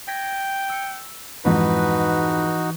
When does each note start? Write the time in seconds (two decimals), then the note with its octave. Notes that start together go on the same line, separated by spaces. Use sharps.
0.08 G5 G#6 A#6 B6
0.70 E6 C#7
1.45 F2 G#2 E3 D#4 E4 F#4 B4